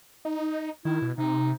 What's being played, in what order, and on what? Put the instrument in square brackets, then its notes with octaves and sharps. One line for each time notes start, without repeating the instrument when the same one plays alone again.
[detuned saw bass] D#4
[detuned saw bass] D#3 [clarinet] E4
[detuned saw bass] B2
[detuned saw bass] C3 [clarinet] D#4
[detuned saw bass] C3